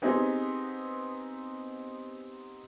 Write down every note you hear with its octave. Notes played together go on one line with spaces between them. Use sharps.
B3 C4 D#4 G4 G#4